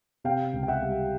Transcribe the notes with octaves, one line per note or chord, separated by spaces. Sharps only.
C3 F5 G5
C#2
G5
E5 F#5
G3